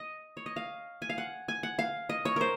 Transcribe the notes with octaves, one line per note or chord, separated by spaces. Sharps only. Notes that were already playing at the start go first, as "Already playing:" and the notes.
Already playing: D#5
C#5
D#5
F5
G#5
F5
F#5
G#5
F#5
F5
D#5
C#5
A#4 C5